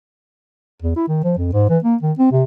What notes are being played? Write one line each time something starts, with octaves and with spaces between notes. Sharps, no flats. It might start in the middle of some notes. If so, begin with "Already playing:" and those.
E2
E4
D#3
F3
F2
G#2
E3
A#3
D#3
C4
C3